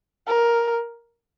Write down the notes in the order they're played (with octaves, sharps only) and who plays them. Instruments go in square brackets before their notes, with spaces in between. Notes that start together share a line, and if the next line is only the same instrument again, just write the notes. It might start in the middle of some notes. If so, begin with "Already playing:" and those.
[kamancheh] A#4